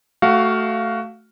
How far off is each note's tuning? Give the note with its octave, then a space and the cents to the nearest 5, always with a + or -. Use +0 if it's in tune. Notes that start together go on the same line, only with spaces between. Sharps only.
A3 +0 F#4 +15 F5 +0